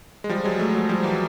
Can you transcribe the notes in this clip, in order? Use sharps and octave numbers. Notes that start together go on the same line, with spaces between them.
G#3
F3 G3
F#3 G#3
G3 A3
F#3 G#3
F3 G3
E3 F#3